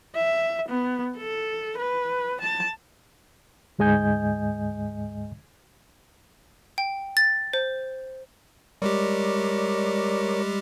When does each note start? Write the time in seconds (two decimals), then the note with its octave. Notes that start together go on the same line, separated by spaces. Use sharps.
0.15 E5
0.69 B3
1.17 A4
1.78 B4
2.41 A5
3.79 D2 G#2 G#3 D#5 G#5 G6
6.78 G5
7.17 A6
7.53 C5
8.82 G3 G#3 G4 A#4 C#5 D5